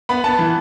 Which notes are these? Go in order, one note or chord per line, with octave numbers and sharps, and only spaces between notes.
B3 B5
B3 A5
E3